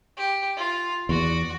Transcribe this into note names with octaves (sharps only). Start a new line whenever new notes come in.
G4
F4
E2 F#4 D5